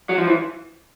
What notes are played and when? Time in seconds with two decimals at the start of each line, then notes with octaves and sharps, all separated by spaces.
0.09 F#3
0.18 F3
0.28 E3